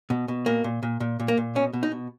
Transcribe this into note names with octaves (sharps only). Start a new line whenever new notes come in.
B2
B2
A#2 A#3
A#2
A#2
A#2
A#2
A#3
A#2
B2 C#4
B2
D#4
B2